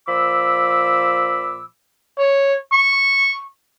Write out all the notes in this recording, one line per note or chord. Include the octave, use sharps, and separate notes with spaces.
A#2 F3 B5 D6 E6
C#5
C#6